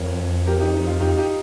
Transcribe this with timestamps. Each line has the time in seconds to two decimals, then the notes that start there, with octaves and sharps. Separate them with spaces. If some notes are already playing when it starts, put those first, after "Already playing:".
Already playing: F2 A#4 C#5
0.46 G4 A#4
0.60 D#4 G4
0.74 D#4
0.86 F4
1.00 F2 D#4 G4
1.17 D#4 G4